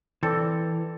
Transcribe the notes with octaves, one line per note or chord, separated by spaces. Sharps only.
E3 C4 A4 D5